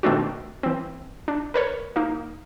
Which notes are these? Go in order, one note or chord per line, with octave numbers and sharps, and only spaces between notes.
B2 D#3 A3 C4 D4 F#4
E3 C4
D4
A#4 B4 C#5 B5
A#3 D#4